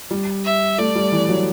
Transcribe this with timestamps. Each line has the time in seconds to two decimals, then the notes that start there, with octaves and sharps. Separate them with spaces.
0.11 G3
0.44 E5
0.78 A3 D5
0.95 G3
1.12 E3
1.29 F#3